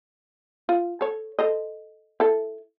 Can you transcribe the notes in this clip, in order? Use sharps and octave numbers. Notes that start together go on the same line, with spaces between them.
F4
A4 C#5
A4 C5 D#5
E4 A4